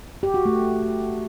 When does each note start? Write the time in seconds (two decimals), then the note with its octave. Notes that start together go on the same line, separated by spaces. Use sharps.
0.23 G4
0.34 F#4
0.45 A3